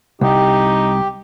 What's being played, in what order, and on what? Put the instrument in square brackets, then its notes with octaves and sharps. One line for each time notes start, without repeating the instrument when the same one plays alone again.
[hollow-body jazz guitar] C2 [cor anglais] D#4 [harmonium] G4